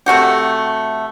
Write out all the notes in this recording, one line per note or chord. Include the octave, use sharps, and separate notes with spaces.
C3 A3 F#4 G4